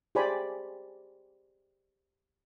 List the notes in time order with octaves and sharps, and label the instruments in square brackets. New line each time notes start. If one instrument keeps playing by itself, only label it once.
[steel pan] G4 G#4 C5 D5 G#5 B5